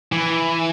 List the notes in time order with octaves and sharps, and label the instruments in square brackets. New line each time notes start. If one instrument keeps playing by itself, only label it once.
[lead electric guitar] E3